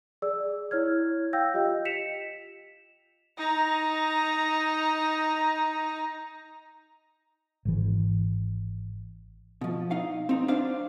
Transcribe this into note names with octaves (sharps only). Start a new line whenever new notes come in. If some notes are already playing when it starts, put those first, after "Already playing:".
G#4 D5 E6
E4 C#5 F6 G#6
F5 G5 E6 G6 A#6
F4 G4 D#5
B6 C#7 E7 F7
D#4 A#5
G#1 E3
B2 F3
D#4 F5
C4 D#4
D4 C5 F5